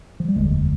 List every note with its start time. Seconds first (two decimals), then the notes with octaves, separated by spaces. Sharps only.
0.20 F3
0.28 G3
0.36 F1 D#2 D3 G#3